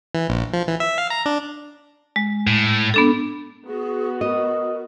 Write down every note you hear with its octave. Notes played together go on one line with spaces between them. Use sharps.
E3
A#1
F3
E3
E5
F5
A#5
D4
G#3
A2
B3 D4 A4
B3 F#4 G#4
A#4 D#5